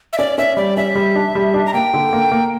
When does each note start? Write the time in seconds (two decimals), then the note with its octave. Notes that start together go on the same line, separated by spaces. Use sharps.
0.13 E5
0.18 C#4 D5
0.38 C#4 E5
0.57 G3 D5
0.77 C#4 E5
0.95 G3
1.15 D4
1.35 G3
1.54 D4
1.66 A#5
1.74 A#3 G5
1.94 D3
2.13 A#3
2.32 A#3